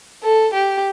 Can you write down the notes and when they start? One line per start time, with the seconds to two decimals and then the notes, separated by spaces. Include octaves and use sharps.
0.23 A4
0.54 G4